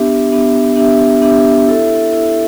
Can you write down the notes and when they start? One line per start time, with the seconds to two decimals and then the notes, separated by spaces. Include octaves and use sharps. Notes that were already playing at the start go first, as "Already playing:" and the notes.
Already playing: B3 D4 G4 E5
0.30 B3 D4 G4 E5
0.76 B3 D4 G4 E5
1.22 B3 D4 G4 E5
1.67 E4 A4 E5
2.13 E4 A4 E5